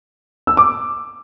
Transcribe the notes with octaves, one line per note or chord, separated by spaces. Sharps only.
E6
D6